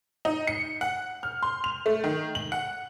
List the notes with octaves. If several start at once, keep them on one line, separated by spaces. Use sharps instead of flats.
D#4
C#7
F#5
F6
C6
F7
A3
D#3
F#7
F#5